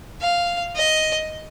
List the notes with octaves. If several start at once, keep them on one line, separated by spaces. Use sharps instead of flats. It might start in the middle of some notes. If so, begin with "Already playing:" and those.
F5
D#5